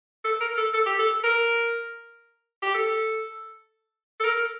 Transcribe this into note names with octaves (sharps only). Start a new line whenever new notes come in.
A4
A#4
A4
A4
G4
A4
A#4
G4
A4
A4
A#4